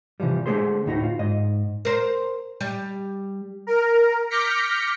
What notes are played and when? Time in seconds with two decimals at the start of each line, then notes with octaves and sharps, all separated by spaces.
0.20 C3 E3 F3 G3
0.46 D3 G#3 A3 G#4 C5 C6
0.86 D2 A2 D#4 F#4
1.03 F4
1.19 G#2 D#5
1.85 A#4 C5
2.61 G3
3.67 A#4
4.30 D6 F6 G6 A#6 B6 C#7